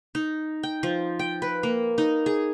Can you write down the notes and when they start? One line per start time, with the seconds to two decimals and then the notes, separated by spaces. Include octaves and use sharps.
0.15 D#4
0.63 G5
0.83 F3
1.19 G5
1.42 B4
1.63 A#3
1.98 D#4
2.26 G#4